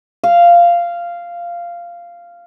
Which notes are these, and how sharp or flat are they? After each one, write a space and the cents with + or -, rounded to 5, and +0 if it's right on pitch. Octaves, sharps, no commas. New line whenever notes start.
F5 -10